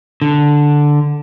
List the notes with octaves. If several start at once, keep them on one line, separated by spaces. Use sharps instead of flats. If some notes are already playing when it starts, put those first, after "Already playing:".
D3